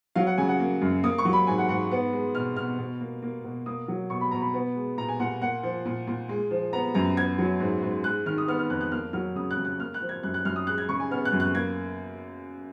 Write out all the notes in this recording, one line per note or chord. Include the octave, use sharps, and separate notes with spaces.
F#3 F5
F#5
C#3 G#5
F#5
A#3
F#2
A#3 D#6
C#6
F#3
B5
G#2 G#5
F#5
G#2 F#5
B3
G#3
B2 F6
B2 F6
B2
A#3
A#3
B2
A#3 D#6
F#3
B2 C#6
B5
B2 A#5
B5
B3
G#3
A#2 A#5
G#5
A#2 F#5
A#3 F#5
F3
A#2
A#2
G#3
F3
B3 A#5
F#2 A#5
B3 G#6
F#3
G#2
G#2
G#3 F#6
D#3 F6
D#6
B3 F6
F6
F2 F#6
F#6
A#3 F6
F#3 F6
C#3 D#6
F#6
C#3
F#6
A#3 F6
F#6
F3
G#6
F#2 F#6
F#6
F#2 F6
D#6
G#3 F#6
G#6
C#3 C#6
G#5
B3 F6
F#6
F#2
F#6
A#3 G#6